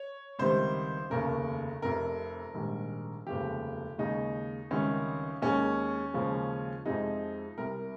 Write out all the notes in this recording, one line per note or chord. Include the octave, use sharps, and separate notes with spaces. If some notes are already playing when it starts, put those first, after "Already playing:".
Already playing: C#5
C#2 C3 D#3 G3 C5
F1 D#2 C#3 A#4
F1 F2 C3 A#4
A#1 G#2 D#3 G3
F1 D#2 C#3 F3 G#3 G4
D#2 C#3 G#3 D#4
C#2 C3 D#3 G3 C#4
D#2 D#3 G#3 C#4
D#2 C#3 F3 G#3
F2 C3 F3 G#3 D#4
C2 C3 G3 A#4